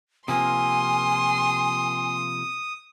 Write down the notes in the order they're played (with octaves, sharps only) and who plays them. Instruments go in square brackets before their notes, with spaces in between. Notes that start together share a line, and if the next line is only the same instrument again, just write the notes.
[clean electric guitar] C3 F3 A#3 [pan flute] G#5 [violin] C6 [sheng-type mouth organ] D#6